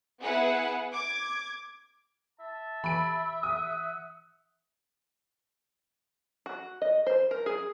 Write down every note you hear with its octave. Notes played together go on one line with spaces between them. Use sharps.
B3 E4 G#4 B4 F#5
D6 G#6
E5 A5
E3 B5 D7
F#5 D#6
F#4
D#5
C5
A#4
G#4